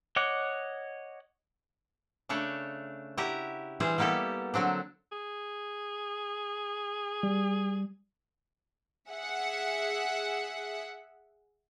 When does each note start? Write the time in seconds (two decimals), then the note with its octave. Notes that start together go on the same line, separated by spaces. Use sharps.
0.16 C#5 D#5 F#5 D6 F#6
2.29 C#3 A3 D4 C#5
3.17 E4 F#4 G4 A#5
3.80 E3 G3 G#4 C5
3.98 G3 A#3 B3 G4 A4
4.54 D3 F#3 C4 D4
5.12 G#4
7.23 G3
9.10 G#4 E5 F#5